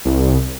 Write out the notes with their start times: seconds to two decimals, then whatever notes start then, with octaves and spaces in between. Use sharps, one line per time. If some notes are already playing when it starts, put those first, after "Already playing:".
0.05 C2